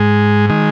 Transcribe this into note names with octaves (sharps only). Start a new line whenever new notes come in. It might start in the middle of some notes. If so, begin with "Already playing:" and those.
Already playing: G#2 G#3
D#3 G#3